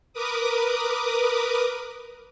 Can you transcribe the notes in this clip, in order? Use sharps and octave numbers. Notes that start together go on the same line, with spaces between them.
A#4 B4 D6 D#6